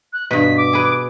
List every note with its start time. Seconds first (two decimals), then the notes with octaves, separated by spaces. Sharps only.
0.13 F#6
0.31 G2 B2 B6
0.57 D6
0.73 G#4 B4